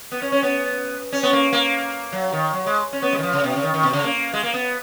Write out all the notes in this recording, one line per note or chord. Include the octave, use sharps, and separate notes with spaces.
B3
C#4
C#4
B3
C#4
B3
A#3
A#3
F#3
D#3
F#3
G#3
C#4
B3
G#3
D#3
F3
C#3
B2
C#3
D#3
D#3
B2
C#3
A#3
G#3
A#3
B3